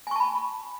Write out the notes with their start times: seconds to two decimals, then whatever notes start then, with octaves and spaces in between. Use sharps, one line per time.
0.07 G#5
0.11 C#6
0.16 A5
0.20 B5